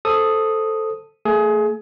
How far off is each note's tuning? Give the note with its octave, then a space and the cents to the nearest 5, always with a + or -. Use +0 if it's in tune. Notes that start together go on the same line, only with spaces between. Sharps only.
A4 +0 C5 +0 D#6 +0
A3 +35 G#4 +25